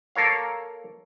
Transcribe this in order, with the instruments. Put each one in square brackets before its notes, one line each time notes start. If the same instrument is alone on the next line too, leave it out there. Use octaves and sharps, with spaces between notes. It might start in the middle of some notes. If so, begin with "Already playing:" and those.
[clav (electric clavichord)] A#3 A4 A#4 C#5 F5